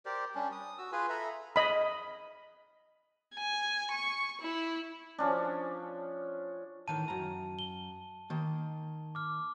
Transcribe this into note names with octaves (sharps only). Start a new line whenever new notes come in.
G4 A#4 C5 D5
G3 C#4 D4
D#6
F#4 E6
F4 G#4 B4 G#5
A4 E5 A#5 B5
D#5 B5
G#5
C#6
E4
F3 C#4 D4
A2 D#3 E3 A5 D#7
F#2 A#5
G7
D#3 A#3
D6 F6